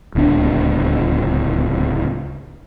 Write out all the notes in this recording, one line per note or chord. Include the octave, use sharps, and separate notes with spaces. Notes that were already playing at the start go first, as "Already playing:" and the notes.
D1 C#2 B3 D4